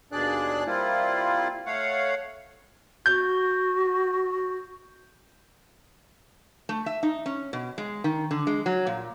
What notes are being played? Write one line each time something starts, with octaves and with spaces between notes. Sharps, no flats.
D#2 B2 D4 G#4 D5 F#6
G3 A#3 C4 E4 F4
A3 C#5 F5 F#5
F#4 G6
A3
E5
D#4
C#4
B2
G#3
D#3
D3
G#3
F#3
A#2